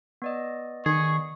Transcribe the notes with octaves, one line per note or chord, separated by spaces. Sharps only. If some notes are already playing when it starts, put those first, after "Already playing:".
B3 D5 D#5
D#3 G#4 C#6